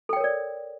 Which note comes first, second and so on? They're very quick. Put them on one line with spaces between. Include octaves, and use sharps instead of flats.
A4 G5 C#5 A#4 D5